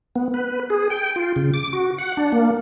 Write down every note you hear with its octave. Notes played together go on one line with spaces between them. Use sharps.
B3
B4
G#4
G5
F4
C#3
D6
F#4
F#5
D4
A#3